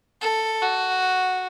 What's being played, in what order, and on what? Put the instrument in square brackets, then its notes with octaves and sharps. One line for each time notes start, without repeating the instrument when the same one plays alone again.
[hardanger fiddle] A4
F#4